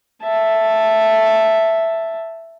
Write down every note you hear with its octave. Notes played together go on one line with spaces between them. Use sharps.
E5 A5